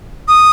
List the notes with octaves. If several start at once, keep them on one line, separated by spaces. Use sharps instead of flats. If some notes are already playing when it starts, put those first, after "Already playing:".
D#6